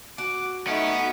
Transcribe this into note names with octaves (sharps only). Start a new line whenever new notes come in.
F#4 F#5 D6
A3 B3 C#4 D#4